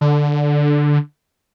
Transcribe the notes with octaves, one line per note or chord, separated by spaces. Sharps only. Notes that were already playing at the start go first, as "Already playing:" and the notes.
D3